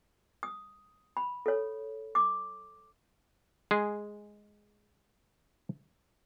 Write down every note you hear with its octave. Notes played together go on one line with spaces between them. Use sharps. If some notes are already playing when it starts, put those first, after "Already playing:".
D#6
B5
A4 C#5
D6
G#3 G#4